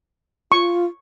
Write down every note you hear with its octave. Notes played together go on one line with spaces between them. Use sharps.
F4 C#6